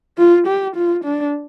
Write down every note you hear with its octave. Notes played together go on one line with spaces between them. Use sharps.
F4
G4
F4
D4